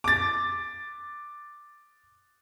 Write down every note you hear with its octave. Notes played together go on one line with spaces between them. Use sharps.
D6 A6